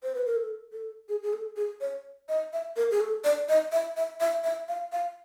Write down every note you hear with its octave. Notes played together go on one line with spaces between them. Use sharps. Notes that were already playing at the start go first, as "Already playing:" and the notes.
C5
B4
A#4
A4
A4
G#4
G#4
A4
G#4
C#5
D#5
E5
A#4
G#4
A4
D5
D#5
E5
E5
E5
E5
F5
F5